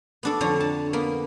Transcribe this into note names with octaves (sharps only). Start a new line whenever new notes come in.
B3 D4 A4
F2 D3 C#5 A#5
A5
A#3 B3